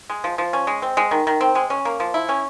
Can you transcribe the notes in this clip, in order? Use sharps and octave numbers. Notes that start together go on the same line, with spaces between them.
G#3
F3
F3
C#4
G#3
C4
G#3
D#3
D#3
C4
G#3
C#4
A#3
F3
E4
C#4